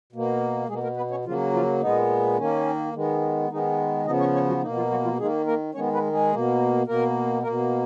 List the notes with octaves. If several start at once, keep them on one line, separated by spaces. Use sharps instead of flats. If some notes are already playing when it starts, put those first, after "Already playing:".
B2 A#3
B2 G#3 A#3 G#4
A#3 A#4
B3 B4
C#4 C#5
C#3 F3 F#3 A#3 F4
F3 F4
A#2 G#3 B3 D#4
D#3 A#3 C#4
D#3 G#3 B3
D#3 G#3 B3 D#4
C#3 F3 B3 D#4 D#5
C#4 C#5
C#4 C#5
F#3 F#4
B2 A#3 D#4
F3 F4
F#3 F#4
F3 F4
D#3 G#3 A#3 G#4
A#3 A#4
D#3 G#3 B3 C#4 C#5
B3 B4
G#3 G#4
B2 A#3
B2 A#3 A#4
B2 A#3 A#4